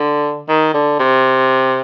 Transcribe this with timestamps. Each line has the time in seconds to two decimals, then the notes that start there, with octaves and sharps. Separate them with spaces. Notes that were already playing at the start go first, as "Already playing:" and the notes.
Already playing: D3
0.49 D#3
0.74 D3
0.99 C3